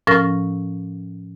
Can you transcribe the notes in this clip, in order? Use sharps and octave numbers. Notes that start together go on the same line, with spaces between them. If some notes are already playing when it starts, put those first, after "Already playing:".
A2 F3 C#4 A#4 F6 A#6